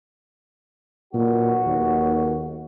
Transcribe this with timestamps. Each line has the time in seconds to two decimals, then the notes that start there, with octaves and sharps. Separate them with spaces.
1.14 B1 A#2 F#4
1.66 D#2